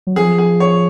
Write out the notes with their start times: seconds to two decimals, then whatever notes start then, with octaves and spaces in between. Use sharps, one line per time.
0.07 F#3
0.16 F3 G#4
0.38 G#4
0.60 C#5